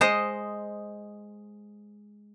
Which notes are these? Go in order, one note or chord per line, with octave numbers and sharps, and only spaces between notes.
G#3 C5 D#5